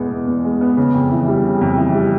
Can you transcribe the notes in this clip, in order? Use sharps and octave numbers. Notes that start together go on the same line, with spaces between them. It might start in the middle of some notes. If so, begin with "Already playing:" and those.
Already playing: E2 B2 G#3 B3
B2
E2
G#3
B3
C#3
F2
E3
G3
C#3
F2
E3
G3